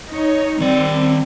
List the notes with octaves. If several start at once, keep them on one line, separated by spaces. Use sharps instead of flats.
D#4 C#5
D#3 G3 C4 D5